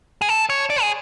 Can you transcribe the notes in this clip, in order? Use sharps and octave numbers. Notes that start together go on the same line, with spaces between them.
G#4
A4
C#5
D5
G#4